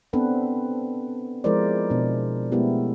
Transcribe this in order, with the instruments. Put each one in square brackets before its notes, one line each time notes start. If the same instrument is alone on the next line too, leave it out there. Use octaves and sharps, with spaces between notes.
[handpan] B3 C4 D4 A4 B4
F3 G#3 E4 A#4 C5 D5
B2 D4
G#3 A3 B3 E4 G4